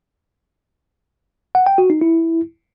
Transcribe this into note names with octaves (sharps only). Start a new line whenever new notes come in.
F#5
G5
F#4
D#4
E4